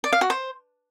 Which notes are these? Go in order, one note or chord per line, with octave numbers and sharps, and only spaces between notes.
D5
F5
F#4
C5